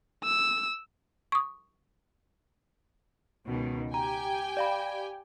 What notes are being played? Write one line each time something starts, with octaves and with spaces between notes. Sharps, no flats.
E6
C#6 D#6
C#2 B2 D#3
G4 G5 G#5 A#5
D5 F5 B5